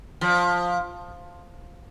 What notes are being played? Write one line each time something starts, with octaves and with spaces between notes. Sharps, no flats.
F3